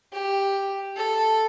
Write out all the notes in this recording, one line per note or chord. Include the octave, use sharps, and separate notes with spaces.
G4
A4